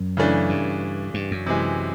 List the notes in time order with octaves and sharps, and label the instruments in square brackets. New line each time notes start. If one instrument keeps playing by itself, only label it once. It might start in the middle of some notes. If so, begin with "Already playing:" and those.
Already playing: [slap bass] F#2
[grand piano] C#3 E3 A3 D4
[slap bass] G2
G2
F#2
[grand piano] C3 E3 G#3